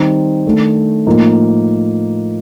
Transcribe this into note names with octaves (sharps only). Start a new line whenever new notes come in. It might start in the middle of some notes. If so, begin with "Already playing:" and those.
Already playing: D#3 G3 C4 D#4
D#3 A3 D4
A2 F3 A#3 D#4